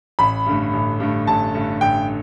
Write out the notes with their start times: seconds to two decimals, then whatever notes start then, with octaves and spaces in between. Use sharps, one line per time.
0.19 A1 B5
0.46 G2 D3 A3
0.73 A1
1.00 G2 D3 A3
1.27 A1 A5
1.54 G2 D3 A3
1.81 A1 G5